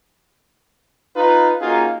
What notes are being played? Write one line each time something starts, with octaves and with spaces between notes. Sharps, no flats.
D#4 F4 B4
A#3 C#4 D#4 F4 F#4 G#4